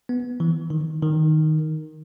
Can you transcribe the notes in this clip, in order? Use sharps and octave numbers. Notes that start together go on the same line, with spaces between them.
B3
E3
D#3
D#3